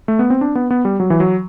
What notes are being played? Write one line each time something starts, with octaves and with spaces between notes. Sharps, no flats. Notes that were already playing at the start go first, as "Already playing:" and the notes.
A3
B3
C4
D4
B3
B3
G3
F#3
E3
F#3